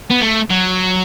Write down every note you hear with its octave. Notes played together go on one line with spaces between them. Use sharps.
B3
A3
F#3